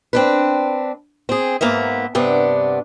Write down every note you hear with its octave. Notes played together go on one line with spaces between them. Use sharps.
C4 D4 B4
C4 G#4
G#2 A#3 B3 E5
G2 C3 B3 D4